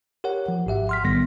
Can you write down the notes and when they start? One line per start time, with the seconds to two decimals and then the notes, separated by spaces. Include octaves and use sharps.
0.24 G4 A#4 C#5 F#5
0.48 F3
0.66 G#1 G#2 G4 E5 F#5
0.89 C6 F6 B6
1.04 B1 A2 D#3 G3 B3 A#6